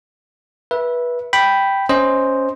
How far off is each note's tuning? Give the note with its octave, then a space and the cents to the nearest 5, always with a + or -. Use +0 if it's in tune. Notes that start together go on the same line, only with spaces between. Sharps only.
B4 -20 E5 +0
G5 +0 B5 +0
C#4 +0 C5 +0 D#5 +0